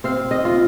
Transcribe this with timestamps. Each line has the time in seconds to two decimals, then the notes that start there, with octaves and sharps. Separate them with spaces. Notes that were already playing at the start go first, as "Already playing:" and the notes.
0.04 C4 F5
0.31 D#5
0.45 F4